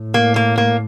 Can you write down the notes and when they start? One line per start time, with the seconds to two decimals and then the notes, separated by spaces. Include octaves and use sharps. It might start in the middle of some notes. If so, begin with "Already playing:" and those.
Already playing: A2
0.14 A#3
0.36 A#3
0.58 A#3